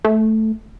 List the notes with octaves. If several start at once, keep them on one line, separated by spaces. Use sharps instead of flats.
A3